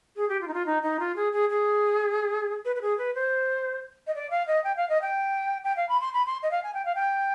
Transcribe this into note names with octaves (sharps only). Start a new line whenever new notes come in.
G#4
G4
F4
D#4
F4
D#4
D#4
F4
G#4
G#4
G#4
B4
B4
G#4
B4
C5
D#5
D5
F5
D#5
G5
F5
D#5
G5
G5
F5
B5
C6
B5
C6
D#5
F5
G#5
G5
F5
G5